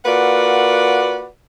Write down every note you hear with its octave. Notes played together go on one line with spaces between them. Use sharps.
A#3 F4 F#4 B4 D5 F#5